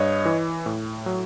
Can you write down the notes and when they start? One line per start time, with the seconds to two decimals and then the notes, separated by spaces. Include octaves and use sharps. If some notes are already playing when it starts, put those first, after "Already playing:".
Already playing: G2 C#5 D#5
0.25 E3
0.66 A2
1.06 F#3